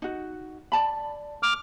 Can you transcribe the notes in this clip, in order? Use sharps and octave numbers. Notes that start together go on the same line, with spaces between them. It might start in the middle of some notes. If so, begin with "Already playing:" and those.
D#4 F#4
D5 A5 B5
D6 F6